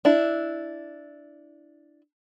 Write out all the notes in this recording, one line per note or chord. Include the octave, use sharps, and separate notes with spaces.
D4 E4